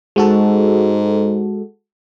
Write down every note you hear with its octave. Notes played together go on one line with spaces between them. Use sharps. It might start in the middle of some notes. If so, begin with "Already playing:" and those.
G#2 G#3 F#4 A4